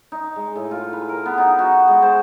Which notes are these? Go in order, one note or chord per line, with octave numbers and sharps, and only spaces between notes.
D#4
G#3
A2
F4
B4
A#4
B3
D#4
F#4
G#3
C5